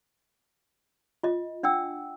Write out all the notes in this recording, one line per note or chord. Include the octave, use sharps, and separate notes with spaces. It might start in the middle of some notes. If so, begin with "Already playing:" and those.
F4 D#5
D4 F#5 G5 E6